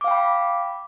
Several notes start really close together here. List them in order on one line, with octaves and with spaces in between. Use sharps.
D6 F5 G5 B5